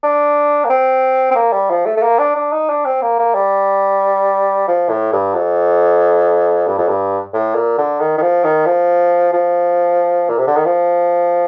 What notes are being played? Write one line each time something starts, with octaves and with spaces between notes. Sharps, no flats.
D4
A#3
C4
C4
A#3
G3
F3
A3
A3
A#3
D4
D4
D#4
D4
C4
A#3
A#3
G3
F3
A2
G2
F2
G2
F2
G2
A2
A#2
D3
D#3
D#3
F3
D#3
F3
F3
A#2
C3
D3
D#3
F3